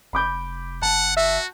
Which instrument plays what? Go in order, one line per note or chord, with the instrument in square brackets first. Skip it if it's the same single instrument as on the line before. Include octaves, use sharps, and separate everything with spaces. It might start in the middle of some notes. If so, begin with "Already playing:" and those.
[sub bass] F1 [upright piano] B5 D6 G6
[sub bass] F#1 [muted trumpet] F#5 [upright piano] A5
[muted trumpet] F#4 [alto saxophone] E5